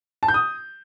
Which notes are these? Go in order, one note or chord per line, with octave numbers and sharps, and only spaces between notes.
A5
G6
D#6